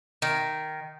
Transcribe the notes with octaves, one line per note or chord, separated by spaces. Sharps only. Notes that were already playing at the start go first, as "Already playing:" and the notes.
D#3